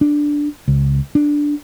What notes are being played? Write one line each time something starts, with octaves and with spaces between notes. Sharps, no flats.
D4
C#2
D4